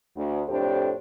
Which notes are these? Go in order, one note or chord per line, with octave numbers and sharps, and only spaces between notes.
D2
F2 A2 D4 G4 A4 C5